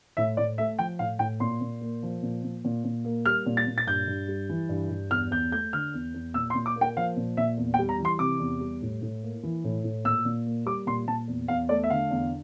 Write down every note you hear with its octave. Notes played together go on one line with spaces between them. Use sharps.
A2 E5
A2 D5
A3 E5
F3 G5
A2 F5
A2 G5
A#2 C6
A#2
A#3
F3
A#2
A#2
A#2
A#2
A#3
G3 F6
A#2
A6
A#2
A6
G2 G6
G2
G3
E3
G2
G2
E2 F6
E2 G6
A3 G6
D3 F6
E2
E2
A#2 E6
C6
A#2
D6
A#3
G5
F3 F5
A#2
A#2 E5
E2
G5
G3
A#5
E3
C6
C3 D6
E2
G3
A2
A2
A#3
E3
A2
A2
A#2 E6
A#2
A#3
G3 D6
A#2 C6
A#2 A5
E2
E2 F5
A3 D5
E5
D3 F5
E2